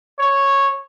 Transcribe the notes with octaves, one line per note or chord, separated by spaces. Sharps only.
C#5